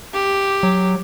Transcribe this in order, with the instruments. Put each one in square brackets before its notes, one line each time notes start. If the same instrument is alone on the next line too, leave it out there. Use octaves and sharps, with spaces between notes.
[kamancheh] G4
[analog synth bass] F#3